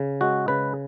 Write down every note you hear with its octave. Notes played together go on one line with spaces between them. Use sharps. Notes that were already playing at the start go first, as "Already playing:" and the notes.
Already playing: C#3
G#3 F#4
C#3 B4